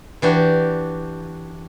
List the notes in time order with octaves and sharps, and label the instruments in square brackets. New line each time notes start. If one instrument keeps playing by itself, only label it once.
[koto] E3 D4 F#4 G4